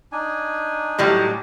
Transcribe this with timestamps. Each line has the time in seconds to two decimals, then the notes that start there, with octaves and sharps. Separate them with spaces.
0.12 D4 D#4 G#5
0.99 A2 F#3 G3